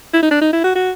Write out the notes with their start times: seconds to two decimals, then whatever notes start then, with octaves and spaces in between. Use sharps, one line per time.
0.13 E4
0.22 D#4
0.31 D4
0.41 D#4
0.53 E4
0.64 F#4
0.75 F#4